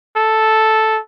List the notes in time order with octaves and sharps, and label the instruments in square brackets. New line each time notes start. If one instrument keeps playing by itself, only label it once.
[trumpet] A4